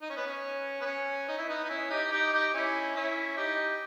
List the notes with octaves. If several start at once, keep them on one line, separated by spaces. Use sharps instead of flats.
D#4
C#4
B3
C#4
B3
C#4
D#4
E4
B3 D#4
D#4
C#4 E4
D#4 G4
D#4 G4
D#4 G4
C#4 E4
C#4 E4
D#4 G4